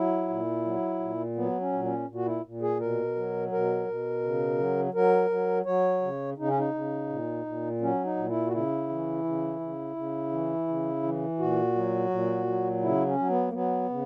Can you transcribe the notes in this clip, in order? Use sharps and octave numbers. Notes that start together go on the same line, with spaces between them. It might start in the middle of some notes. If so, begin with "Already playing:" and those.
Already playing: F#3 E4
A#2
F#3
A#2
F#3 B3
C#4
A#2
C#4
A#2
F#4
E4
A#2
G#4
B2 A#4
F#3
B2 A#4
B2
C#3
F#3
F#3 A#4
F#3
F#3 C#5
C#3
C#3 D#4
C#4
D#4
C#3
A#2
A#2
F#3 C#4
D#4
A#2
E4
F#4
C#3 E4
E3
C#3
C#3
C#3
E3
C#3
E3
A#2 F#4
F#3
A#2
F#3
C#3 E4
C#4
F#3
B3
A#3
F#3 B3
C#3